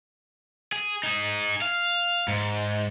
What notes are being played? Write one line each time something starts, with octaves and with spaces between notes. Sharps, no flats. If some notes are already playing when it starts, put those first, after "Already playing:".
G#4
D#4 G#4
F5
G#2